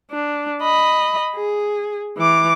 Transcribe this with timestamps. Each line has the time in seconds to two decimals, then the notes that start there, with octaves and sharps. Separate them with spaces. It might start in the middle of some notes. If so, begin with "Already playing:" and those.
0.11 D4
0.63 D#5 B5
1.35 G#4
2.17 E3 D6